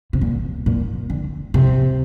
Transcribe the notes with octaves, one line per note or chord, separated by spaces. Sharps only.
C3
A#2
A#2
D3
C3